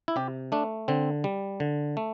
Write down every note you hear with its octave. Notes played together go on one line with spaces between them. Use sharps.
E4
C3 G4
A3 D4
D3 C4
G3
D3
A3